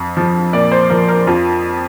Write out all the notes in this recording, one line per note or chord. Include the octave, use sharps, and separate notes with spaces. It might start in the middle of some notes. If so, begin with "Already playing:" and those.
Already playing: F2
F3
A#2 D5
C5
F3 A#4
A#4
F2 F4